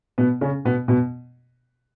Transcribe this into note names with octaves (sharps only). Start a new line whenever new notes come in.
B2 B3
C#3 C#4
B2 B3
B2 B3